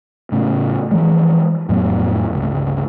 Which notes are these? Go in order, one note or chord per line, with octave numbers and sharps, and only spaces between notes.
A2 C#3
E3 F3 G#3
F2 A2 F#3 B3
G1 C#2